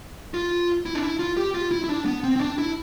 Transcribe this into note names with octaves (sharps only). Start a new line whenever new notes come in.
F4
E4
D4
E4
F4
G4
F4
E4
E4
D4
B3
C4
C4
D4
E4